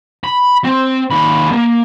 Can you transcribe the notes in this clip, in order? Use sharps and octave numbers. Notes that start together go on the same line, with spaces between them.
B5
C4
D#2 B5
A#3